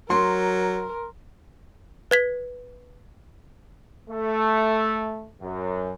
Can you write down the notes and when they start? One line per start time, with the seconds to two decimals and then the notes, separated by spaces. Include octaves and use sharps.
0.10 F#3 A#4 C6
2.11 B4 G#6 B6
4.09 A3
5.41 F#2